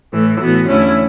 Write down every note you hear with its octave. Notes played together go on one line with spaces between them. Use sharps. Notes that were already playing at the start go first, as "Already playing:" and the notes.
A2 E3 A3
A2 E3 B3 F#4
E2 D3 A3 C#4 E4